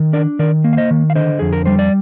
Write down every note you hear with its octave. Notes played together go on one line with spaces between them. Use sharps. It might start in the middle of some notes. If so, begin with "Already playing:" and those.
Already playing: D#3
D4 A#4 D5
D#3 A#4 D5
A#3
F5
C5 D#5
D#3
F5
D3 C5 D#5
F2 G#4
A#4
G3 C5
D5